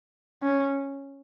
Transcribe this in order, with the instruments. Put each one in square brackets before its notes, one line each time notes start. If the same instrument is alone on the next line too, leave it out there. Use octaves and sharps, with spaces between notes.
[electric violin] C#4